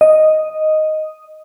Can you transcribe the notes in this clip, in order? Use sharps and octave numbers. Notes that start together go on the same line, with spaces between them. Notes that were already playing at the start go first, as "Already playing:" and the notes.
D#5